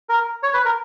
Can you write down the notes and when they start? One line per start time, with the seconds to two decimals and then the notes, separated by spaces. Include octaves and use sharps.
0.09 A#4
0.43 C#5
0.53 B4
0.65 A#4